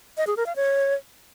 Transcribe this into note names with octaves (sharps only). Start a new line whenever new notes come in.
D#5
G#4
A#4
F5
C#5